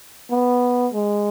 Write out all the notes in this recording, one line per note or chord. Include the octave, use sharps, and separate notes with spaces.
B3
G#3